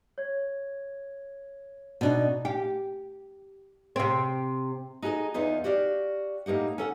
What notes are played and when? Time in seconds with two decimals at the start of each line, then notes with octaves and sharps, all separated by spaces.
0.18 C#5 G#6
2.01 B2 D4 D#4 D5
2.45 G4
3.96 C3 C4
5.02 D#4 F#4 G#4 A4 D#5
5.34 E2 B3 D#4 F4
5.64 F#4 G4 D5 F5
6.46 A2 A#3 D#4 G4 F#5
6.78 C#4 A4 F#5